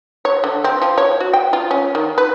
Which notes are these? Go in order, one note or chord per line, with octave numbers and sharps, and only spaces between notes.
C#5
D3
C4
F3
C#5
F#4
G5
F4
C#4
D#3
B4